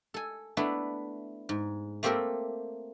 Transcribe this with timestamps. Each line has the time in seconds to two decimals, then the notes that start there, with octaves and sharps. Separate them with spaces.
0.14 A4 G#5
0.57 A3 B3 D4 E4
1.49 G#2
2.03 A3 A#3 C4 G4 A4 A#4